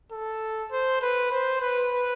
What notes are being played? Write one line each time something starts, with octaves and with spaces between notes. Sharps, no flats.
A4
C5
B4
C5
B4